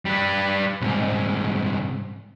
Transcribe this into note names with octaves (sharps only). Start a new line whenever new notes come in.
G3 B4
C2 G#2